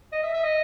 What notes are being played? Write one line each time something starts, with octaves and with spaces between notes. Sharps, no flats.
D#5
E5
E5
D#5